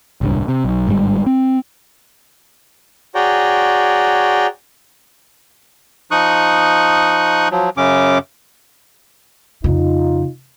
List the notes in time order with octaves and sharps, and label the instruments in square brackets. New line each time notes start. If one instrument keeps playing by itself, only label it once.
[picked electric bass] D1 C2 G2
C3
B1
G1 G#2 D#3 G3
C4
[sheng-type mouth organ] F#4 G#4 C#5 D5 G5 A#5
[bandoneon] F3 D#4 C#6 D#6 F#6
F3 F#3
F#2 C#3 C#4 D6
[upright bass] F2 C#3 [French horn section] D#4 F4